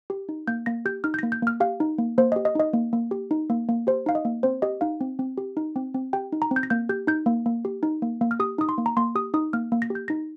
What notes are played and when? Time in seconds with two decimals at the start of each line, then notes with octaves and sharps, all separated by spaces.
0.10 G4
0.29 D#4
0.47 A#3 G6
0.66 A#3 A#6
0.85 G4 G6
1.04 D#4 F6
1.14 G6
1.19 A#6
1.23 A#3
1.32 G6
1.42 A#3 F6
1.60 G4 F5
1.80 D#4
1.98 A#3
2.18 A#3 C5
2.32 D#5
2.36 G4
2.45 D#5
2.55 D#4 D#5
2.73 A#3
2.93 A#3
3.11 G4
3.31 D#4
3.50 A#3
3.69 A#3
3.87 G4 C5
4.06 D#4 F5
4.15 D#5
4.25 A#3
4.43 C4 C5
4.62 G4 D#5
4.81 D#4 F5
5.01 C4
5.19 C4
5.38 G4
5.57 D#4
5.76 C4
5.94 C4
6.13 G4 G5
6.32 D#4
6.42 A#5
6.51 C4
6.56 G6
6.63 A#6
6.70 A#3 G6
6.89 G4 G6
7.07 D#4 G6
7.26 A#3
7.46 A#3
7.65 G4
7.83 D#4
8.02 A#3
8.21 A#3
8.31 F6
8.40 G4 D#6
8.58 D#4 D#6
8.69 C6
8.78 A#3
8.86 A#5
8.97 A#3 C6
9.15 G4 D#6
9.34 D#4 D#6
9.53 A#3 F6
9.72 A#3
9.82 A#6
9.90 G4
9.95 G6
10.08 D#4 A#6